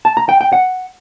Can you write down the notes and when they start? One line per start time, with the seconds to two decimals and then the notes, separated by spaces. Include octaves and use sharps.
0.05 A5
0.17 A#5
0.29 G5
0.41 G5
0.53 F#5